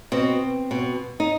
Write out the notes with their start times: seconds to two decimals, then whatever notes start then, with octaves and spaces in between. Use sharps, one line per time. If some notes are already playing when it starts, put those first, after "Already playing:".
0.12 B2 C4
0.71 B2
1.20 D#4